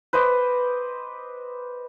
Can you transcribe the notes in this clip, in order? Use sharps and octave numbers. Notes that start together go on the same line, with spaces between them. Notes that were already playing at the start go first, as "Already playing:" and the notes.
B4 C5 D#5 D6